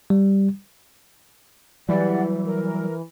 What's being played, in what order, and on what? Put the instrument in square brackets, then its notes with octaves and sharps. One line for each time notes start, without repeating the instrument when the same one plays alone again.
[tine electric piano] G3
[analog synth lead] E3 [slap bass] F#3 G3 [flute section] G4 D5 F#5
[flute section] A#4